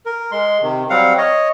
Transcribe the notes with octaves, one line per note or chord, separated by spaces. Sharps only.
A#4
G#3 C6
C3 D#3
F#3 G3 C4 F5 F#5
C#5 D#5